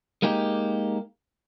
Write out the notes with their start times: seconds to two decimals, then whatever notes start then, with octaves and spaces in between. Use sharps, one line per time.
0.22 G#3 A#3 D#4 G4